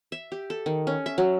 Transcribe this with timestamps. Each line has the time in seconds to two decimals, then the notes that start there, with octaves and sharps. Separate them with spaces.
0.12 E5
0.32 G4
0.50 A4
0.66 D#3
0.87 C#4
1.06 E5
1.18 F#3